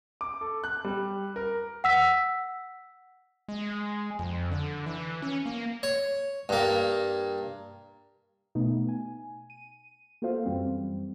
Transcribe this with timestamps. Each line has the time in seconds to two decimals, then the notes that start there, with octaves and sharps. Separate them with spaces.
0.21 D6
0.41 A4
0.64 F#6
0.84 G3
1.36 A#4
1.84 F#5 E6 B6
3.48 G#3
4.19 F2
4.52 D3
4.86 E3
5.22 C#4
5.46 A#3
5.83 C#5
6.49 G2 A#3
8.55 B2 A3 B3 D#4
8.89 G#5
9.50 D#7
10.22 A#3 F4 F#4 A4 C5 F5
10.46 F#2 E3 G3 C4